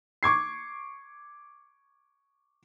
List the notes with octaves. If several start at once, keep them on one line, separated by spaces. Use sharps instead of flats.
C#6 D6 G#6 C7